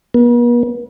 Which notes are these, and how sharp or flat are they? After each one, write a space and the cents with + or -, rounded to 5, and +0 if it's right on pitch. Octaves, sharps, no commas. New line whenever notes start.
B3 -45